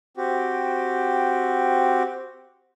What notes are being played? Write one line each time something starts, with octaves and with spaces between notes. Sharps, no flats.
C4 F#4 G4